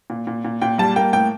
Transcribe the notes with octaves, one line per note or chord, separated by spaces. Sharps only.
A#2
A#2
A#2
A#2 G5
G3 A5
A#3 G5
A2 G5